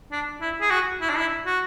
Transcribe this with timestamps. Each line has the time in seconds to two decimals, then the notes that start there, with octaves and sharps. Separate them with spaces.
0.12 D4
0.41 E4
0.61 G#4
0.71 F#4
1.01 E4
1.10 D4
1.18 E4
1.46 F#4